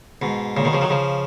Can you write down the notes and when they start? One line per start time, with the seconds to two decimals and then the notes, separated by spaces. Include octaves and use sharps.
0.22 G#2 B2
0.57 A#2 C#3
0.65 B2 D#3
0.73 C#3 F3
0.81 D#3 F#3
0.90 C#3 F3